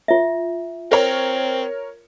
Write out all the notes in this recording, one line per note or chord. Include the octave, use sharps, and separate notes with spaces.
F4 E5
C4 A#4 C#5